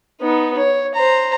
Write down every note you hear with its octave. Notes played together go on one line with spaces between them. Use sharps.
B3 D#4
C#5
C5 A#5